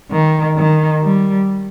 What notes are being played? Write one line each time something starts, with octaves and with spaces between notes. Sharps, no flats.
D#3
D#3
G3